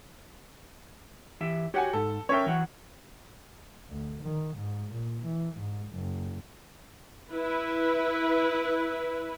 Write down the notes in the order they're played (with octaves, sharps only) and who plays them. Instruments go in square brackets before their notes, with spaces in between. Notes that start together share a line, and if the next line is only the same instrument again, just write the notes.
[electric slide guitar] E3 G4 E5
[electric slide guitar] F#4 C#5 [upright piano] G4 F#5 G#5
[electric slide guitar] G#2 [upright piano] A4
[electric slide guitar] C#4 A4 A#4 [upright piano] C#5 E5 G5
[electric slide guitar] E3 F#3 F#5
[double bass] D2
D#3
G#2
A#2
E3
G#2
F#1
[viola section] E4 B4